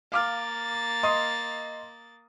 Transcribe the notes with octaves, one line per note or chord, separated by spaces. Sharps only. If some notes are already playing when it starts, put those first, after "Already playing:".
A#3 F5 D6 F6 A6
D#5 C6 D#6